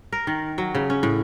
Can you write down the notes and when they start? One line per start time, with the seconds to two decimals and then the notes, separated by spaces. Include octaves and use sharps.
0.12 A#4
0.27 D#3
0.58 F#3
0.75 C#3
0.90 C#4
1.03 A2